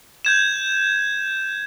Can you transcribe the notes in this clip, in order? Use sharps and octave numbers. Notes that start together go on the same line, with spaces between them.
G6 G#6 E7